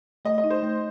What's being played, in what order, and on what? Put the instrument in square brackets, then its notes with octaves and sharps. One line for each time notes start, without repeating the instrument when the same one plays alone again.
[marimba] A3 [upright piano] D#5
[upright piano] D#5
[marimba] D#4
[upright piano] C5
[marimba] A3